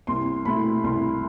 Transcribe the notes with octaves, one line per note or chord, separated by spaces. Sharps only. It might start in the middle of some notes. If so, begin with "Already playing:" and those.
C2 C6
B2 A3 E4 B5
C2 C6